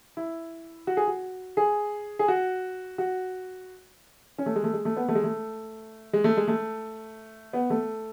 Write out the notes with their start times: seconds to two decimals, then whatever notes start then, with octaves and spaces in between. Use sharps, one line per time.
0.17 E4
0.87 F#4
0.97 G#4
1.07 F#4
1.57 G#4
2.19 G#4
2.28 F#4
2.98 F#4
4.38 C#4
4.46 A3
4.56 G#3
4.64 A3
4.74 G#3
4.85 A3
4.97 B3
5.08 A3
5.15 G#3
5.24 A3
6.13 G#3
6.24 A3
6.37 G#3
6.48 A3
7.53 B3
7.70 A3